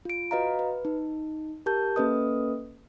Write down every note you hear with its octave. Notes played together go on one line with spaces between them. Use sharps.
F4 D7
F#4 B4 D#5 F5 A#5
B4
D#4
G4 A#4 A5 G6
A#3 C#4 A4 B4 D#5 D#6